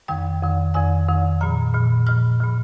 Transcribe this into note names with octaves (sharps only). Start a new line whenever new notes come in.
F2 D#3 G5
F2 D#3
F2 D#3 G#5
F2 D#3
A#2 F3 A#5
A#2 F3
A#2 F3 F6
A#2 F3